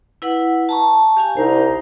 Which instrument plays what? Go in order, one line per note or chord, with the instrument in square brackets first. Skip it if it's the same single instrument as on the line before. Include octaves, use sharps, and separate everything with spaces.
[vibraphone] E4 B4 F#5
A5 A#5 C#6
G4 F5 G#5
[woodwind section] C2 D#4 [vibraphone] C5